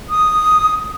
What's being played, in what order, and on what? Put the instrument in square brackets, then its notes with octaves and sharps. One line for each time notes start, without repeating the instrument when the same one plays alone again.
[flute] D#6